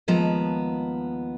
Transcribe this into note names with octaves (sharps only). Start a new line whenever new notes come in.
D#2 F3 G#3 B3 A5 A#5